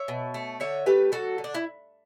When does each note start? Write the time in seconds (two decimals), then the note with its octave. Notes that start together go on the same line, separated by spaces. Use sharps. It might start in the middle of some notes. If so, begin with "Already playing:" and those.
Already playing: C#5 E5
0.08 B2
0.34 A3
0.60 D3 C#5 E5
0.86 A3 G4 B4
1.12 F#3 F#4 A4
1.38 D3
1.44 D4
1.54 E4